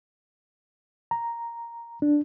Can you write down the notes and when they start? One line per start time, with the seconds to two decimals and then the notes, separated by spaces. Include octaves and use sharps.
1.11 A#5
2.02 D4